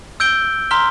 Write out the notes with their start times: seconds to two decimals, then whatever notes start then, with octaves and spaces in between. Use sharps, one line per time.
0.20 E6 G6 D7 G7
0.71 A#5 C6 F6 B6 G7